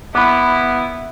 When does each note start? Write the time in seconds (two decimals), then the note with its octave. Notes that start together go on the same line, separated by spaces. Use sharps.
0.15 B3 E4 B5 D6